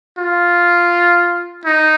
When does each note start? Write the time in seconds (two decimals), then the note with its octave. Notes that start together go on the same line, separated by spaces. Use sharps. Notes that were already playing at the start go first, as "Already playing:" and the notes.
0.18 F4
1.65 D#4